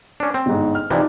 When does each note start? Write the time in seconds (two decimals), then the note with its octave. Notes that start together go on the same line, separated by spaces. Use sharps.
0.20 C#4 D4
0.34 C4
0.46 G1 G#2
0.75 F6
0.90 C3 E3 F3 D#4 D5